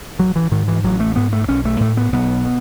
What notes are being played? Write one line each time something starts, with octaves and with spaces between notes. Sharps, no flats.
A1 F#3
E3
G#2 D#3
E3
A1 F#3
A3
G#2 B3
A3
B1 C#4
A3
A2 A3
B3
B1 B3
B2